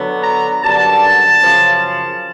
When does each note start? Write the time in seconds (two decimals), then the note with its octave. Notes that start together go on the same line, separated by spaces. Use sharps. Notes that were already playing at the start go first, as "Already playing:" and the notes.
Already playing: D3 F#3 B3
0.23 A#5
0.62 F#2 D3 G3 B3 A5
1.41 F#2 C#3 F3